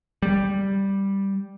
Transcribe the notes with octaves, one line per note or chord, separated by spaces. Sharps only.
G3